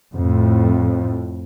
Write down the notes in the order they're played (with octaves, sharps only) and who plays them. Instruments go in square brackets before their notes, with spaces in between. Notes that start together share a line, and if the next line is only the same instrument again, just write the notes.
[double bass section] F2 A2